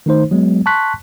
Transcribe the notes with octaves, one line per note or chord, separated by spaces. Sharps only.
D#3 A3 D#4 C5
F#3 G#3 B3
A5 C6 C#6 F#6 B6